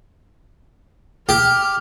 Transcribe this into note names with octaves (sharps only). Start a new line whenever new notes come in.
G4 F6